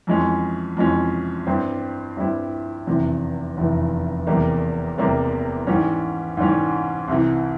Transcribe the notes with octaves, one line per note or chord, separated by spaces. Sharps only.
F2 E3 G#3 C#4
F2 E3 G#3 C#4
G2 G3 C4 E4
G2 G3 C4 E4
F1 E2 C3 E3
F1 E2 C3 E3
E1 E2 C3 G3 A#3
E1 E2 C3 G3 A#3
G#2 E3 G3 C#4
G#2 E3 G3 C#4
C2 C3 E3